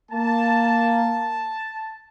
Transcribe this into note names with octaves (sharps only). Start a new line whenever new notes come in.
A#3 A5